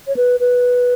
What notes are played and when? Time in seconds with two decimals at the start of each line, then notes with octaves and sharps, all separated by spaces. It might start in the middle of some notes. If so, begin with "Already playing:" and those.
0.07 C#5
0.16 B4
0.40 B4